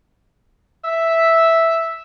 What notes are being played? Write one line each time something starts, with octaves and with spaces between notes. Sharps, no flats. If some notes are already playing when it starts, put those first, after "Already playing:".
E5